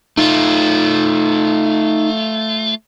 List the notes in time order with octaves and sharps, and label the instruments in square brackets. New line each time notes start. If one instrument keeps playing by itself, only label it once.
[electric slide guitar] A3 F4 [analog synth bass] D#4